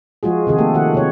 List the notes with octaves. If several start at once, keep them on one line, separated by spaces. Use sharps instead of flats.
F3 G#3 F4 F#4 G#4
C3 D#3 G#4
A3 A#3 G4 A4
D#3 F#4 F#5
C3 C#5